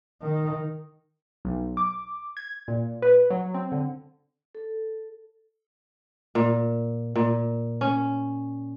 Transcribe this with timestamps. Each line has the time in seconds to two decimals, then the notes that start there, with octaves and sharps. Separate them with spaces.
0.22 D#3
1.45 B1
1.77 D6
2.37 G#6
2.68 A#2
3.02 B4
3.30 F#3
3.54 C4
3.72 D3
4.55 A4
6.35 A#2
7.16 A#2
7.81 C#4